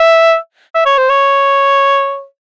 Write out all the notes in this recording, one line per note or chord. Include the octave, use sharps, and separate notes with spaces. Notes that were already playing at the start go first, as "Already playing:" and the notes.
Already playing: E5
E5
C#5
C5
C#5